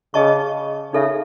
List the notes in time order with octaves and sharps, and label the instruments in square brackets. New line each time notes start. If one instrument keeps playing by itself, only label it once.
[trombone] C#3 [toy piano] G#4 D#5 A5 C#6
[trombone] C#3 [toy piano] D#4 A4 E5